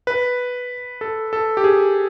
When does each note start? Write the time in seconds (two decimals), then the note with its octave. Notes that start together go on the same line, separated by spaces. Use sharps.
0.07 B4
1.01 A4
1.33 A4
1.57 G4
1.64 G#4